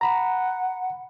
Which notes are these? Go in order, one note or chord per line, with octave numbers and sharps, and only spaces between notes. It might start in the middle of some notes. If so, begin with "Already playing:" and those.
F#5 A#5 B5